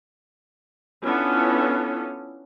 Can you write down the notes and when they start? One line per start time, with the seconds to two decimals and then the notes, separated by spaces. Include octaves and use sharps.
1.04 B3 C#4 D4 E4 F4 A4